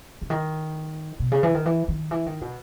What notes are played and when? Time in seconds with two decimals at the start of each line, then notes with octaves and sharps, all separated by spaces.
0.22 C#3
0.30 D#3
1.20 B2
1.32 C#3
1.43 E3
1.54 D#3
1.66 E3
1.88 D#3
2.11 E3
2.26 D#3
2.41 B2